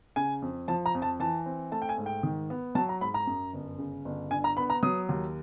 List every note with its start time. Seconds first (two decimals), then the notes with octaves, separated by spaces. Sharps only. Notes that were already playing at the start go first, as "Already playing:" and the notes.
0.16 C#3 G#5
0.42 F2
0.68 F3 A5
0.86 A#5
0.95 F2
1.02 A5
1.20 E3 A5
1.46 C4
1.72 A3 A5
1.82 G5
1.89 G#5
1.98 G#2
2.06 G5
2.23 D#3
2.50 B3
2.75 F#3 A5
2.89 A#5
3.01 G#2 B5
3.14 A#5
3.27 F#2
3.53 G1
3.79 C#3
4.05 G1
4.31 D3 G#5
4.44 A#5
4.57 B3 B5
4.70 A#5
4.83 F#3 D#6
5.09 D#2